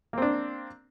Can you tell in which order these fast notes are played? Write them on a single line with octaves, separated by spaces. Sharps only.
A#3 C4 D4